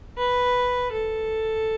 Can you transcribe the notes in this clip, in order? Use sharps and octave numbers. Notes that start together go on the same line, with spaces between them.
B4
A4